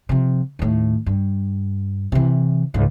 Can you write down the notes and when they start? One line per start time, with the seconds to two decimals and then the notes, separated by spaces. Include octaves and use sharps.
0.09 C3 F3
0.59 D#2 A2
1.06 G2
2.12 C3 E3
2.74 C#2 G#2